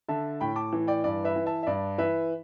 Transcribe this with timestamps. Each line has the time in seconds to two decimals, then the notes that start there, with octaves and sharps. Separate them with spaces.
0.09 D3 E5 A5
0.41 A2 G5 B5
0.56 A5 D6
0.73 E3
0.87 D5 G5
1.04 G2 D5
1.24 B4 E5
1.36 E3
1.46 E5 A5
1.63 E5
1.67 G2 D5
1.98 E3 B4 E5